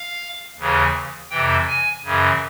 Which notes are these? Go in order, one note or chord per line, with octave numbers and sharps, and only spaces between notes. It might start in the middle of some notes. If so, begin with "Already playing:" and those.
Already playing: F5
D#2 C#3 E3
F2 C3 E3 G5
G#5
F#2 C#3 E3